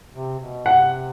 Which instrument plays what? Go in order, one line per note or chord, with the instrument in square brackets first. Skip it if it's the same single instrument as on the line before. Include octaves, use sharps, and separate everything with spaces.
[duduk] C3
B2
[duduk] C3 [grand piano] F#5